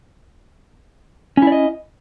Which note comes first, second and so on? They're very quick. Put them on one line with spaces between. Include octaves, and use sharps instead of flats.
C#4 E4 D5 D#5